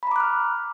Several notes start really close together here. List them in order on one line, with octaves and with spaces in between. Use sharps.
B5 A#5 D6 F#6 F6